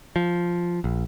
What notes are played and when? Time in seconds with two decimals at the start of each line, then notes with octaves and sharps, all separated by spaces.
0.16 F3
0.84 A#1